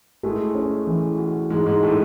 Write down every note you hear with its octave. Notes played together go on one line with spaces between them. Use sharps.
A2 G#3 A3
C#4
E3
F#4
G#2 E3 G#3
G#2 G#3
A2 A3 F#4